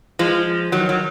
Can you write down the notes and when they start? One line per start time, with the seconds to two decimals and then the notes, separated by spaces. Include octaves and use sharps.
0.19 F3 G#3
0.72 D#3 F#3
0.89 F#3